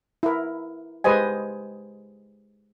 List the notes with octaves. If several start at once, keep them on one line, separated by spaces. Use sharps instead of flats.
E4 A#4
G#3 G4 B4 C5 D#5 G#5